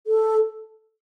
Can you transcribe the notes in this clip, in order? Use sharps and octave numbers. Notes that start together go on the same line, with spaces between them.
A4